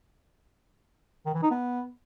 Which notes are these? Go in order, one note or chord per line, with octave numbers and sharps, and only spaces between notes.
D#3
E3
D#4
B3